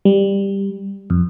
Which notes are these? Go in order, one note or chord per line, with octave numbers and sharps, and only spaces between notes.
G3
F2